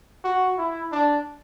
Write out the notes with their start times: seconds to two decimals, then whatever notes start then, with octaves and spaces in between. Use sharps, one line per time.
0.24 F#4
0.58 E4
0.92 D4